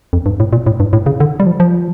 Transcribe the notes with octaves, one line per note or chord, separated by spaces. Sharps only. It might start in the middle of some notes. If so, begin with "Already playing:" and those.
F2
G2
A2
A#2
A2
G2
A2
C#3
D3
G3
F3
F3